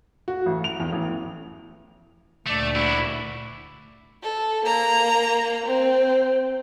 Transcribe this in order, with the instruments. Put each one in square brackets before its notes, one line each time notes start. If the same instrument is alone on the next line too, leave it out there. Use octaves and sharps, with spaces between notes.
[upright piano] F#4
A1
F7
E2
A1
[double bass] D2 A#2 [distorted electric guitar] A3 [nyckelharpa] D5 E5
[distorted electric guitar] E4 F#4
[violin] A4
A#3 A#5
C4